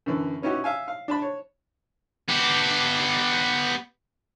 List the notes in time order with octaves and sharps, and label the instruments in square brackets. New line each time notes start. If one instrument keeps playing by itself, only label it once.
[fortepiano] F#2 D3 E3
B3 C#4 D#4 E4 F#4 G4
E5 F5 G#5
F5
D4 A5 B5
C#5
[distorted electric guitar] B3 G4